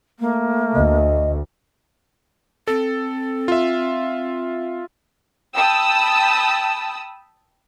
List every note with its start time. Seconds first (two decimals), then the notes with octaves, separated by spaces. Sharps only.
0.19 A3 A#3
0.75 D2 D#5
2.67 C4 A4
3.48 F4 E5
5.55 G5 A5 B5 D#6 E6